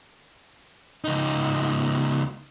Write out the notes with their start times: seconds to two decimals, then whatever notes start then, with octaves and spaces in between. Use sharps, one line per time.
1.04 C#2 D#4